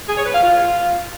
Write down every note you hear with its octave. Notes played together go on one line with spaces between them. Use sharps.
G#4
C#5
B4
F5
F4